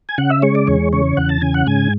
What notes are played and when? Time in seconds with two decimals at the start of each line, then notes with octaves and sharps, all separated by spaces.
0.09 G#5
0.18 C#3 F#5
0.30 E5
0.42 G#3 C#5
0.55 D5
0.67 E2 C#5
0.93 C#3 C#5
1.17 E2 F#5
1.29 A5
1.41 C#3 G#5
1.54 F#5
1.67 G#2 G#5